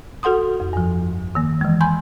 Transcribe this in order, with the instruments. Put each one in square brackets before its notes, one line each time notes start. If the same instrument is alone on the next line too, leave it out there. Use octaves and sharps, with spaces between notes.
[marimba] F#4 A4 F#5 C6 D#6
F2
G2 F3
D#3 A#3
E3 G#3
G#5 B5 C6 G6